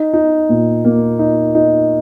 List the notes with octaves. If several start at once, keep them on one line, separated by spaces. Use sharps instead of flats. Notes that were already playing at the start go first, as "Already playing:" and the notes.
Already playing: D#4
D#4
A#2
A#3
D#4
D#4